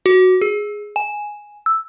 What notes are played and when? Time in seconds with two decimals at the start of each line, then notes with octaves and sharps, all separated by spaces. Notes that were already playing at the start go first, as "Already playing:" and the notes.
0.06 F#4
0.41 G#4
0.96 G#5
1.66 E6